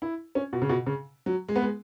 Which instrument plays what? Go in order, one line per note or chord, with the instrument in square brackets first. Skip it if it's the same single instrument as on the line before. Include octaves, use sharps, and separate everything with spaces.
[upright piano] E4
C#4
B2
C#3
B2
C#3
F#3
G#3
B3
G#3